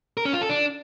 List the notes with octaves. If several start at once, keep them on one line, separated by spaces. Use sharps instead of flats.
A#4
C#4
F4
A4
D4